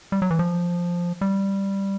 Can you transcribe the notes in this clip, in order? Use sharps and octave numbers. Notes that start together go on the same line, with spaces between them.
G3
F#3
E3
F3
G3